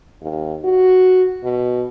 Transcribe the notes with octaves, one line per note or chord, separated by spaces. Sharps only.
D#2
F#4
B2